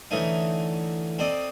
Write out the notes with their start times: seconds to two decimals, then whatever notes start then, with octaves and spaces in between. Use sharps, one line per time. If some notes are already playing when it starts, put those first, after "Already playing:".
0.11 D3 E3 A3 C#4 D#4
1.19 C4 A4 D5 D#5